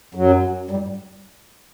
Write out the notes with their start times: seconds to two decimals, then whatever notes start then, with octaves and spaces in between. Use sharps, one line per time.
0.15 F#2 F#3
0.71 G2 G3